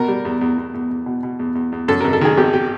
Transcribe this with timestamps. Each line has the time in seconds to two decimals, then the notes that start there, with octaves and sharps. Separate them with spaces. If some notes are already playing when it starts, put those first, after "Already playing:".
Already playing: B2 A#4
0.08 G3
0.25 E2
0.41 E2
0.58 E2
0.74 E2
0.90 E2
1.06 B2
1.23 B2
1.39 E2
1.55 E2
1.72 E2
1.88 F#2 A4
2.01 G#1 A#4
2.13 A4
2.21 D#3 G#4
2.37 G#1 G4
2.53 G4